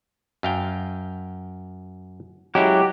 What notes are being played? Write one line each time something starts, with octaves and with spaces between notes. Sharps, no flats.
F#2 F5 G5
F#3 G#3 C#4 E4 G4